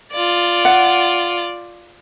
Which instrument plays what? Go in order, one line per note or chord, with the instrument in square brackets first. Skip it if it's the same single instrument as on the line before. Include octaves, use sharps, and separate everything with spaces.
[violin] F4 D5
[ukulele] F#5